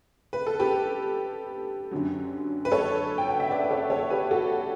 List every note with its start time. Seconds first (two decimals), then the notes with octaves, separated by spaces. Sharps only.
0.33 B4
0.47 A4
0.59 G4 B4
1.91 F#2 D3 F#3
2.65 B4
2.71 A4 C#5
3.18 G5
3.28 F#5
3.40 E5
3.51 B4 D5
3.64 B4
3.70 A4 C#5
3.90 A4 C#5
4.10 G4 B4
4.31 F#4 A4